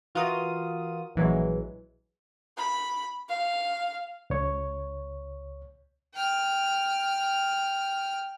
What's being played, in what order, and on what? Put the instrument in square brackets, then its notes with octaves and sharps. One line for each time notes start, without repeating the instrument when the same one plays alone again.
[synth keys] E3 F4 F#4 A#4 D#6
A#1 E3 F#3 G#3
[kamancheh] B5
F5
[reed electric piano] C#2 C#5
[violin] G5 F6